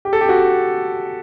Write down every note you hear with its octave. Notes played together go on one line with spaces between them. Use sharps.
G4
A4
G4
F#4